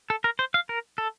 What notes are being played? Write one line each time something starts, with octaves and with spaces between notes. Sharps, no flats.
A4
A#4
C5
F5
A#4
A4